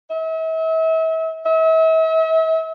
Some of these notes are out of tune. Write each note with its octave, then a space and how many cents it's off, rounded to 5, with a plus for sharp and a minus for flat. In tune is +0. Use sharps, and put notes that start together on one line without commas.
E5 -40
E5 -40